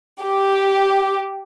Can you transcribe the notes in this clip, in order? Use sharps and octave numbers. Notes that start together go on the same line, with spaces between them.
G4